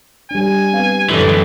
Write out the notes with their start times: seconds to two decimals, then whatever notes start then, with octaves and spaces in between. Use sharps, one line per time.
0.31 G3 D4 G#5
0.73 B3 C4 F5
1.10 F#2 D3 E3 A3 E5